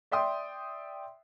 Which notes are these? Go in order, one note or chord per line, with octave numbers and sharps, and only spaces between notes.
D5 E5 G5 C6 D#6